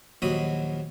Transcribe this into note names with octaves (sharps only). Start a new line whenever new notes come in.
A#1 D#2 F#3 F#4 B5 D#6